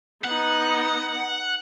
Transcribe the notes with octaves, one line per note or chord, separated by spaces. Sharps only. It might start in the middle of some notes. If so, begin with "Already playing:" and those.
B3 D#4 F#5